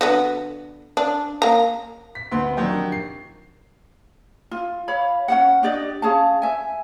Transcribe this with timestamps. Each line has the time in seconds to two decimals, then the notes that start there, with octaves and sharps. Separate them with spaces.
0.01 D3 B3 F#4
0.97 D4
1.42 A#3 A#5
2.15 B6
2.32 D2 B3 C6
2.57 D#3 F3 F#3 D4 G4
2.92 C7
4.51 F4
4.88 C#5 F5 B5
5.28 C#4 F#4 F#5
5.63 D4 G4 D5 D#5
6.02 C#4 G#4 F5 A5
6.42 E5 G#5